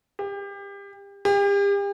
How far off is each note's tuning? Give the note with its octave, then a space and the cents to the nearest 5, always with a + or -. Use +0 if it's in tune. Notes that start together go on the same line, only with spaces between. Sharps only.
G4 +30
G4 +40